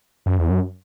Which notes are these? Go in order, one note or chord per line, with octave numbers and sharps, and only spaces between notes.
F#2
E2
F#2